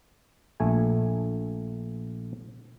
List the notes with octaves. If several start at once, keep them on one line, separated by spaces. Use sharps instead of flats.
A#1 A3 G#5